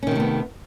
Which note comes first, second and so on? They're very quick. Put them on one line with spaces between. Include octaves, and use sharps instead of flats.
C#4 D#3 C3 A3 B3